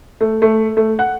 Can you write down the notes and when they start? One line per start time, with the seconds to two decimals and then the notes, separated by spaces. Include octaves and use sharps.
0.21 A3
0.42 A3
0.77 A3
0.99 F#5